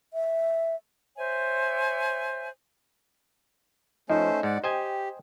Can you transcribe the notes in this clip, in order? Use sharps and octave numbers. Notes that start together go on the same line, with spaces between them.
E5
C5 C#5 E5 G#5
F3 A3 C#4 D#4 C5
G#2 D5 F#5
G4 C5 D#5 G5 G#5